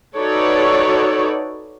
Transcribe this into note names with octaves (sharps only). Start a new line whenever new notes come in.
D#4 F#4 A4 B4 C#5 D5